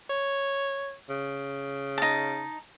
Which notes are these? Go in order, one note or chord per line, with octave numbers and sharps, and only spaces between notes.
C#5
C#3
D#4 A5